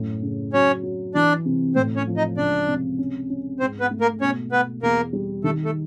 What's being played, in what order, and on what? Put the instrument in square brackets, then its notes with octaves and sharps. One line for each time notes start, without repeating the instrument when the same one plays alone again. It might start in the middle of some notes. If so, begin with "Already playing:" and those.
Already playing: [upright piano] F#2 A2
C#3
[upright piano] F#3 [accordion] C#4 C#5
[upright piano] F#3
[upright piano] E3 [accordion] D4 D5
[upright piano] C3
[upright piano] A2 [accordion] C4 C5
[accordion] C#4 C#5
[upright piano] F3
[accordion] D#4 D#5
[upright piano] C#2 [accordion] D4 D5
[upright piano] C3
C#4
C#4
[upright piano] G#2 [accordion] C4 C5
[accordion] B3 B4
[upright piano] A3
[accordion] A#3 A#4
[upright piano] B2 [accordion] C#4 C#5
[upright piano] B2 [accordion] B3 B4
[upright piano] E2 [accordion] A#3 A#4
[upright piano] G3
[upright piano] D#3 [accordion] A3 A4
[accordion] A3 A4